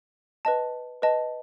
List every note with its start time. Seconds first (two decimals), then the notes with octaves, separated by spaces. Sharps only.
0.45 B4 D#5 A5
1.02 B4 D#5 A5